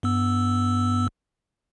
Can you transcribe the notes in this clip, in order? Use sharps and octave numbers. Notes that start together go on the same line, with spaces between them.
G2 B3 E6